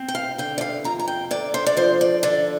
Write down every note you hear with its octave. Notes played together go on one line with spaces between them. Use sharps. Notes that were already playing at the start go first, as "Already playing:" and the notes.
Already playing: C4
G5
F5
D3 G5
D5
F5
F2 A#5
A#5
G5
D3 D5
C5
D5
F3 C5
D5
D3 D5